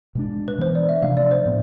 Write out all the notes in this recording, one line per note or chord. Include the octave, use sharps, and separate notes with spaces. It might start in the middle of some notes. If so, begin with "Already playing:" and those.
B2 G#3 D4
B4
E3 B3 D4 C5
D5
E5
C3 F3 A3 D4 F5
D5
C5
A2 F3 B3